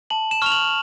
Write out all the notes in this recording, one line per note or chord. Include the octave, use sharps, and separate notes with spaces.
A5 F#7
E7
C#6 F6 F7
F#7